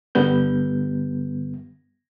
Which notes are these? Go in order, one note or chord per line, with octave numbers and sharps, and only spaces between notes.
G2 D3 G3 B3 G6